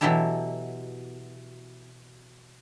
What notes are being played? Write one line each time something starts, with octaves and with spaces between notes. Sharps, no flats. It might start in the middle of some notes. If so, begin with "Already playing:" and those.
B2 E3 F#3 E4 G4 A4